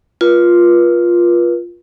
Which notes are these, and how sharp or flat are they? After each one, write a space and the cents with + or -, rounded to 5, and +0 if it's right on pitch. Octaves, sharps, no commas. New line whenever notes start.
F4 +0 B4 -40